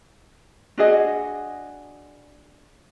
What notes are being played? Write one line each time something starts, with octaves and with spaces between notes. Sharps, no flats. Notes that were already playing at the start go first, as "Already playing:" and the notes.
D4 F#4 G#4 D#5